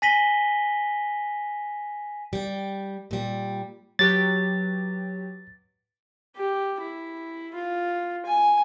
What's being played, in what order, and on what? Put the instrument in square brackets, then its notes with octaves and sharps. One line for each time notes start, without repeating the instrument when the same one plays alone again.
[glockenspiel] G#5 A#6 B6 D#7 F#7 G7
[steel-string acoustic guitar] G3 G5
A#2 G3
[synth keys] F#3 G4 B4 [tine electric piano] A6
[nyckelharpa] G4
E4
F4
G#5